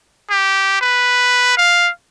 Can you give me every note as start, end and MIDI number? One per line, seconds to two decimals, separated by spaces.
0.30 0.79 67
0.81 1.56 71
1.57 1.89 77